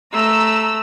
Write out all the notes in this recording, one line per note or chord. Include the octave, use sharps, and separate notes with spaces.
A3 A#5 E6